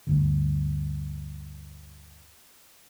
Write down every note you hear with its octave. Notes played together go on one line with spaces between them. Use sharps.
D2 G2 D3